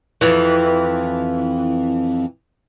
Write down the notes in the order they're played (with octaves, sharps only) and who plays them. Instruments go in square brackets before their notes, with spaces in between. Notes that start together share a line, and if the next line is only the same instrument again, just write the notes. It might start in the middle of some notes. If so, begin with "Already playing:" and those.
[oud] F2 E3